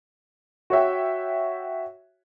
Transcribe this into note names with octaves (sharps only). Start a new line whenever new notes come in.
F#4 C#5 E5 G5